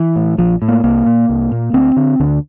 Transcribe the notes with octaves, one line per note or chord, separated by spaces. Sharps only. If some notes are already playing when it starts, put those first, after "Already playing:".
Already playing: E3
A2
A#1 F3
A2
A#3
C2 A#3
A#2
C2
A#2
D2 C4
D3
D2 D3